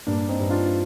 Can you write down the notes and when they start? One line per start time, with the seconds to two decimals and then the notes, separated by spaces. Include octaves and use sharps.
0.07 G2 A#3 D4
0.29 C4 D#4
0.40 G2
0.50 D4 F4